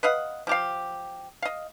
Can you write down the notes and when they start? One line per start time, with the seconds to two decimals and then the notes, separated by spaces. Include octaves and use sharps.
0.03 B4 D#5 F5 F#5
0.47 F3 G4 F5
1.42 D#5 F5